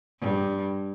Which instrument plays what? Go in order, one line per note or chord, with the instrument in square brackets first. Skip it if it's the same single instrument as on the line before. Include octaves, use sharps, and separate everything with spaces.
[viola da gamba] G2